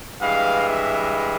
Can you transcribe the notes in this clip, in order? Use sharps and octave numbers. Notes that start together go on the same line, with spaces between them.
G2 E3 G#3 F5
E5